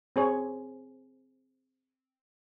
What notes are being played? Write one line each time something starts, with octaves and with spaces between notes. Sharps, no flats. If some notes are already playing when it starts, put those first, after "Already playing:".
C4 G#4 C#5